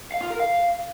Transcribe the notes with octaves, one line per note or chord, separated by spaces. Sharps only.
F5
F4
A#4
F5